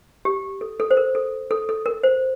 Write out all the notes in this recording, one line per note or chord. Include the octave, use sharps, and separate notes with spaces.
G4
A4
A4
C5
A#4
A4
A4
A4
A#4
C5